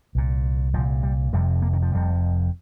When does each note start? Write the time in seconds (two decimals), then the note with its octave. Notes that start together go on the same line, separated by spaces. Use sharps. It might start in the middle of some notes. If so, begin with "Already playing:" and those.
0.15 C2 A#2
0.74 C2 A#2 F3
1.03 G3
1.33 F1 F2 C3 G3
1.62 A#3
1.73 D#3
1.82 F3
1.92 F1 F2 C3 G3